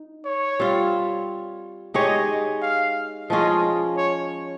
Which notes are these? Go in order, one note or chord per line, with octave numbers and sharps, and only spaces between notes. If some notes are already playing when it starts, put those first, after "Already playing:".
Already playing: D#4
C#5
G3 C4 F4
G#3 D#4 G4 C#5 D#5
F5
F3 G#3 C#4 F4 D#5
C#5